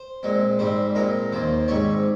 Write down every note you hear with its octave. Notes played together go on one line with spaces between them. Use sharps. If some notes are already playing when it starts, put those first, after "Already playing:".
Already playing: C5
A#2 G#3 C4
G#2 G3 C4 C5
A#2 G#3 C4 A#4
D#2 D#3 A#3 C5
G#2 G3 C4 C#5